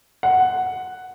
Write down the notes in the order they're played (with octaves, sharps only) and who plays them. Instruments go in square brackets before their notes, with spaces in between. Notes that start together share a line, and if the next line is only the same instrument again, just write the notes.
[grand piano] F#5